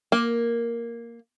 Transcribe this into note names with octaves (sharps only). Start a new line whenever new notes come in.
A#3